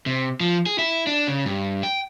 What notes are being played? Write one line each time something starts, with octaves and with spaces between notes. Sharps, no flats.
C3
F3
G#4
E4
D4
C#3
G2
G5